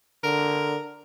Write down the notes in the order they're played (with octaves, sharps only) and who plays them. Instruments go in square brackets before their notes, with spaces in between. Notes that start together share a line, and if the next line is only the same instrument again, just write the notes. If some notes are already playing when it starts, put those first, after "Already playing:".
[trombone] D3 [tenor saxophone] A#4